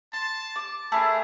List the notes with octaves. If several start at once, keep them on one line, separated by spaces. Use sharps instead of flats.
A5 C6
D6
A3 C#4 G#4 A#4 A5 B5